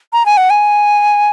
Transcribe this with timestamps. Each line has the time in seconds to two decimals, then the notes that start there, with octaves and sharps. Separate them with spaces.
0.13 A#5
0.26 G#5
0.37 F#5
0.50 G#5